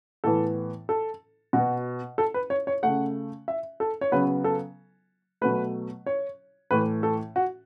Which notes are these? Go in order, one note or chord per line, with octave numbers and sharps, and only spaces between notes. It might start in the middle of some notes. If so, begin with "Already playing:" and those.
A2 E3 B3 A4
A4
B2 B3 F#4
A4
B4
C#5
C#5
C#3 A3 F#5
E5
A4
C#5
C#3 F#3 B3 B4
A4
B2 F#3 A3 B4
C#5
A2 E3 A3 B4
A4
F#4